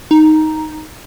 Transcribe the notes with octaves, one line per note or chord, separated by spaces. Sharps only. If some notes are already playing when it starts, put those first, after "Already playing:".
D#4